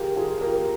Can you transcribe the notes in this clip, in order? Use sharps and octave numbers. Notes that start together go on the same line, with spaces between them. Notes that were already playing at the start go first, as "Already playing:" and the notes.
Already playing: F4 G4 G#4 A#4
F4 G#4
G4 A#4